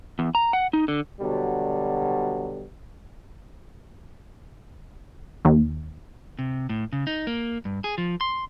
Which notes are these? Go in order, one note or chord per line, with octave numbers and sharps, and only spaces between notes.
E2
A#5
F#5
D#4
D3
B2 D3 F#3 G3
D#2
C3
A2
C#3
D#4
A#3
G2
G#4
F3
C6